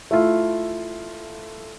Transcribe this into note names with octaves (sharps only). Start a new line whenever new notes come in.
A3 E4 F4